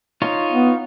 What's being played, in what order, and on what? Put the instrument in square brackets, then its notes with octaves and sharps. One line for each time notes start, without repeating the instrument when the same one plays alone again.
[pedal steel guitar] D#4 F4 C#5
[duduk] B3